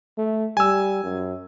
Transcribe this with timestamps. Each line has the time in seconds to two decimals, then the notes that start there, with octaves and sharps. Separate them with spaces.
0.18 A3
0.57 G3 G#5 E6
1.03 F#2